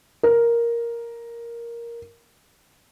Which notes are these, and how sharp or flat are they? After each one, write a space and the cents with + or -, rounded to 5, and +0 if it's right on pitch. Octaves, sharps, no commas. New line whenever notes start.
A#4 +5